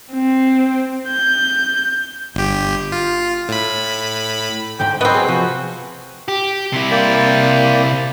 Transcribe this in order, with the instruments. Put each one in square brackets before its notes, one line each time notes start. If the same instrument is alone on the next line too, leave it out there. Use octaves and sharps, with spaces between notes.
[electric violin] C4
G6
[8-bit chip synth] G1 G4
F4
A2 B5
[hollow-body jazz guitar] D2 G#2 [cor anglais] G5
[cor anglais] F#3 [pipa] B3 C4 [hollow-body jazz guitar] D#5
[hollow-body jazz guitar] G#4
[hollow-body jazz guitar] C3 F3 [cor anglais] F#4
[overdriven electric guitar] G4
C3 E4
[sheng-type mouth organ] A#3 D5 G5